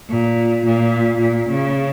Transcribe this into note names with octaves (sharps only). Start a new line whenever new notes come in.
A#2
A#2
A#2
C#3